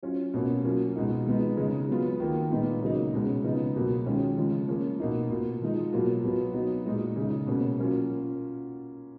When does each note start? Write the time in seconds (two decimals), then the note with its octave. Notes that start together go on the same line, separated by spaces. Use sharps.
0.03 F#3 C#4 F4
0.34 B2 A#3 C#4
0.64 F#3 A#3 C#4 F4
0.96 B2 G#3 D#4
1.26 F3 G#3 B3 D#4
1.57 C#3 G#3 D#4
1.89 F#3 B3 F4
2.20 D#3 A#3 F4
2.51 A#2 G#3 B3 D#4
2.82 C#3 F#3 A#3 D#4
3.13 B2 G#3 C#4
3.44 C#3 F3 B3 D#4
3.76 B2 F#3 A#3
4.06 D#3 G#3 C#4 F4
4.37 C#3 F3 G#3
4.68 F3 A#3 C#4
5.00 B2 A#3 D#4
5.30 B2 A#3 F4
5.62 F3 G#3 D#4
5.92 B2 F#3 A#3 F4
6.24 B2 F#3 B3
6.54 F#3 B3 D#4
6.86 A#2 G#3 D#4
7.16 C#3 G#3 D#4
7.47 B2 A#3 C#4
7.79 F#3 A#3 C#4 F4